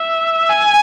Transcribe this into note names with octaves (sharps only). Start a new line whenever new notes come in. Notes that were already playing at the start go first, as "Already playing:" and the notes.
Already playing: E5
G#5